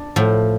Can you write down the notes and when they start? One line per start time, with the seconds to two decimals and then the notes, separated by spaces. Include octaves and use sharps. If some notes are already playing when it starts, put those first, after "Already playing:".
Already playing: D4
0.16 A2 F3